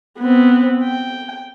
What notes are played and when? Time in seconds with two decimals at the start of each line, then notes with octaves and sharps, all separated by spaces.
0.19 B3 C4
0.83 G5